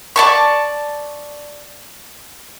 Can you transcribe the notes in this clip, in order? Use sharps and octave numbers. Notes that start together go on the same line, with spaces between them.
D5 A5 C#6